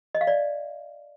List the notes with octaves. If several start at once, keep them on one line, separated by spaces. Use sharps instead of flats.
D#5
F5
D5